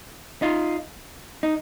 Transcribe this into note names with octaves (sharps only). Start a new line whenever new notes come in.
D#4 F4
D#4